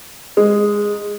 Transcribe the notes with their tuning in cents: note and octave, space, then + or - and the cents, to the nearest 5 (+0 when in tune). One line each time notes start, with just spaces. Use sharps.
G#3 -10